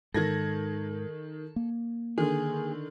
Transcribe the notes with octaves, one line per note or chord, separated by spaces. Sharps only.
G#2 D#3 A4 G#6 A#6
A#3
D3 D#3 G#4